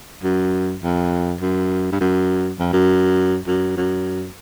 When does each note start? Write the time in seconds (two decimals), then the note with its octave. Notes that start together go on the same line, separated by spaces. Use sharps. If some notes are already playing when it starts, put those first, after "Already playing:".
0.23 F#2
0.83 F2
1.41 F#2
1.92 G2
2.01 F#2
2.59 F2
2.73 F#2
3.47 F#2
3.77 F#2